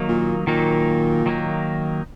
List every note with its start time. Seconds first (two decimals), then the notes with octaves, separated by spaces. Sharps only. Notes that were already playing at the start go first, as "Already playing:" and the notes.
Already playing: D#3 F#3 A#3 D#4
0.08 A#2
0.47 A#2 D#3 F#3 A#3 D#4
1.26 D#3 F#3 A#3 D#4